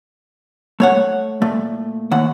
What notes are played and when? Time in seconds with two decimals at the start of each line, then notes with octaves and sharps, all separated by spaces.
0.80 A3 C#5 F#5
1.42 A#2 A3
2.11 D#2 F#5